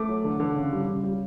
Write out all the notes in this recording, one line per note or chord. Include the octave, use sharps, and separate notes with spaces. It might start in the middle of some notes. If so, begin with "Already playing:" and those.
Already playing: A3 D6
F#3
D3
D3
C#3
G3
C#3
G3